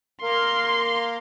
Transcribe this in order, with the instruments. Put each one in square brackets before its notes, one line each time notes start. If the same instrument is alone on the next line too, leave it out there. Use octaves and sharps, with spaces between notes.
[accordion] A#3 A#4 F5 [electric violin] C6